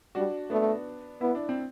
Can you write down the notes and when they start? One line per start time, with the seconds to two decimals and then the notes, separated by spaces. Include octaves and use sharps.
0.15 G3 D4 F#4
0.50 A3 B3 D4
1.21 B3 E4
1.35 D4
1.49 C4